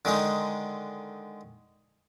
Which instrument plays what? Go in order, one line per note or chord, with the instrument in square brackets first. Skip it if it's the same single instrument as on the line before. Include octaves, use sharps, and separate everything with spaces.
[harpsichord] D3 D#3 G#3 D#4